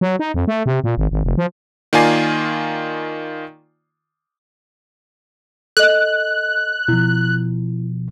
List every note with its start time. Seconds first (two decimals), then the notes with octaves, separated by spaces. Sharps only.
0.01 F#3
0.19 D#4
0.34 F2
0.48 A3
0.66 C3
0.84 A#2
0.98 G#1
1.11 G#1
1.24 F1
1.38 F3
1.93 D#3 A#3 F4 D5 G#5 C7
5.77 A4 D#5 F#6
6.88 B2 F3 E4